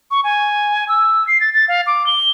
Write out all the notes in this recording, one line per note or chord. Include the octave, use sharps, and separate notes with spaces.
C#6
G#5
E6
C7
A6
A6
F5
D6
G7